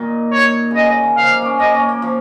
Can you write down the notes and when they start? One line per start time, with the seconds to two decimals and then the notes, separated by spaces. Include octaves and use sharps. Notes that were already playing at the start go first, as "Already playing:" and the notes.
Already playing: A#2 D#3
0.33 C#5
0.71 A#2 C#3 D#5
0.90 C#3
1.03 D#3
1.17 F3 F5
1.31 A#3
1.42 A#3 C#4
1.60 A#3 D#5
1.74 C#4
1.89 A#3
2.02 F3